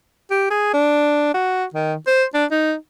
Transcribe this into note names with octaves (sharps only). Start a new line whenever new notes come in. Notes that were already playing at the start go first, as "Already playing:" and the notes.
G4
G#4
D4
F#4
D#3
C5
D4
D#4